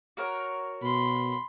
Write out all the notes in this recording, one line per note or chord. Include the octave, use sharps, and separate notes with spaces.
F#4 A#4 C#5
B2 B5 C6